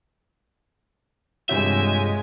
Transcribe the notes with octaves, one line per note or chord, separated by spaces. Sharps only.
G2 C3 G#3 F4 C#5 E5 F#5 G6